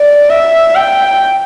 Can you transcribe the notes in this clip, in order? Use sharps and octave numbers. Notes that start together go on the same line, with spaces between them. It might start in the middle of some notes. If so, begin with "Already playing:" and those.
Already playing: D5
E5
G5